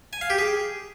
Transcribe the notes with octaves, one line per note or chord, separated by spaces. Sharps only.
G#5
F5
G4
G#4